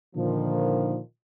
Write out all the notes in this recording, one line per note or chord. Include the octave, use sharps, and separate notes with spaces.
A#2 D3 D#3 F3